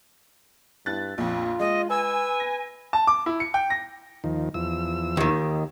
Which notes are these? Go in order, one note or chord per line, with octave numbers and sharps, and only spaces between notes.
G2 E4 F#6 A6
A#1 F2 F4
G#3 D#5
B4 G#5 E6
A#6
A5
D6
E4
C#7
G5
A#6
D#2 D#3 F3
E2 F3 E6
D#2 D#3